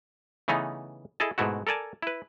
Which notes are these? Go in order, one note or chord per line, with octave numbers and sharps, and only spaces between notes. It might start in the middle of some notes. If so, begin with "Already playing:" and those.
C#3 E3 A3 B3 D#4
E4 G#4 A4 D#5 A5
G#2 B2 A3 E4 F#4
A4 A#4 D5 G#5 A5
E4 B4